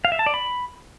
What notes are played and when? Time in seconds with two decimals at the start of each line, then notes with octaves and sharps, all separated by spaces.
0.05 F5
0.12 E5
0.19 A5
0.26 D5
0.34 B5